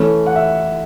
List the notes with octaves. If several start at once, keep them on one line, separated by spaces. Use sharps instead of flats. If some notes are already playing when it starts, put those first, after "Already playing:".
Already playing: E3 A3 C#4
F#5
E5